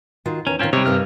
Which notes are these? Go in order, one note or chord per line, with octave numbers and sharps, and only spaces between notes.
D#3 F4 F#4
E2 D#3 C#4 A#5
A2 D#3 C4 C#4 F4
C3 G3 D#4 C#5
G2 A#3 D#4 F6